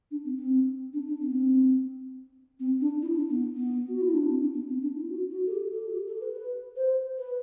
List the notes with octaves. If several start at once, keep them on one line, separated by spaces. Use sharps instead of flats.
D4
C4
C4
D4
D4
C4
B3
C4
C4
D4
E4
D4
B3
B3
F#4
E4
D4
C4
D4
B3
C4
D4
E4
F#4
F#4
A4
G4
A4
F#4
G4
A4
B4
B4
C5
B4